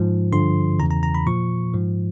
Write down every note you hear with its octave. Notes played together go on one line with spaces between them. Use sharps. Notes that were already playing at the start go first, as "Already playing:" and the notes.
Already playing: G#2 F3
G2 D3 F3 C6
E2 C#3 E3 A#5
A#5
A#5
B5
A#2 F3 C#6
G#2 F3